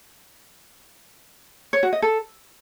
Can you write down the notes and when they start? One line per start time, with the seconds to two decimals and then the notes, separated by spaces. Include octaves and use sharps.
1.73 C#5
1.83 F#4
1.93 D#5
2.02 A4